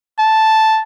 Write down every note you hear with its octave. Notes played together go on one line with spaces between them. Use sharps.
A5